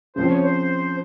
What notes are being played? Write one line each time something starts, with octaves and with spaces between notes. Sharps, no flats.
C#3 F3 C4 C5
C#5
C5